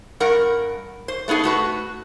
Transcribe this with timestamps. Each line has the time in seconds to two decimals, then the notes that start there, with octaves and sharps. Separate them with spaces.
0.20 G2 A#4 F#5
1.08 C5
1.28 A3 B3 D#4 G#4 A4
1.44 A3 F#4 B4